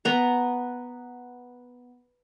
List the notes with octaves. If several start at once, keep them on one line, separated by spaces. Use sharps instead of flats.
B3 A#5